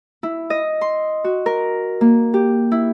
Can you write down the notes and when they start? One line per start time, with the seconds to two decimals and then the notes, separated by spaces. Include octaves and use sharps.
0.23 E4
0.50 D#5
0.81 C6
1.24 F#4
1.46 A#4
2.01 A#3
2.34 G4
2.72 E4